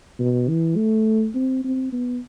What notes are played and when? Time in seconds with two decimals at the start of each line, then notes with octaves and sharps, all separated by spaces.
0.19 B2
0.48 E3
0.77 A3
1.35 C4
1.64 C4
1.93 B3